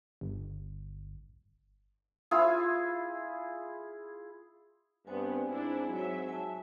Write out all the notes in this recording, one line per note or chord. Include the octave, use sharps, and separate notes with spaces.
G1
E4 F4 G#4
G2 B3 C4 C5 G#5
G#2 D4 E4
F#3 E5
G#5 A5